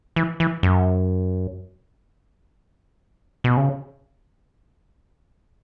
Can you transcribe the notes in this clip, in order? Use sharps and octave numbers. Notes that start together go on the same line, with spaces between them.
E3
E3
F#2
B2
C#3